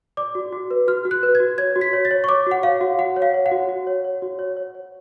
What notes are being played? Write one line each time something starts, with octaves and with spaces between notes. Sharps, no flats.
D5 D6
F#4
F#4
B4
F#4 F6
F#4
F#6
B4
G#6
F#4
C#5 G#6
F#4
B6
C#5
A6
C#5
C#6
C#5 D6
F#4 F#5
C#5 F5
F#4
F#4 F#5
C#5
F5
C#5
F#5
F#4
F#4
C#5
C#5
F#4
C#5
C#5
C#5